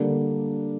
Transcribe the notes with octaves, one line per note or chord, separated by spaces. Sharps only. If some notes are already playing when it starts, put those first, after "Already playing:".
Already playing: D3 G3 A#3 D4